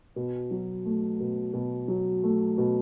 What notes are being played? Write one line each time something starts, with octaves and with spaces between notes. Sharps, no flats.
B2
F#3
A3
B2
B2
F#3
A3
B2